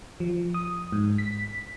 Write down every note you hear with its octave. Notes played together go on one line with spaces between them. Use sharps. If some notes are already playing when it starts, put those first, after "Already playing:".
F3
D#6
G#2
B6